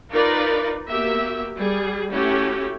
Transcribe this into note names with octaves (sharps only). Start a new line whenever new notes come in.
D#4 F4 A#4 B4 D5
A#3 B3 F#4 G4 E5
G3 G#4
A3 C#4 E4 F#4 G4